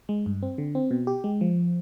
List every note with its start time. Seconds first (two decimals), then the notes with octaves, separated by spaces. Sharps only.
0.09 G#3
0.26 G2
0.43 C4
0.58 D3
0.75 C4
0.91 B2
1.07 G4
1.24 G#3
1.41 F3